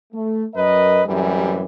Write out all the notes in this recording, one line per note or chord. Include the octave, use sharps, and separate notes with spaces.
A3
F#2 A#4 B4 D#5
F#2 A2 C3 E3 G3